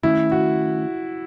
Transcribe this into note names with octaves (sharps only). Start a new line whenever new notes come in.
D#3 A3 C#4 E4
F#4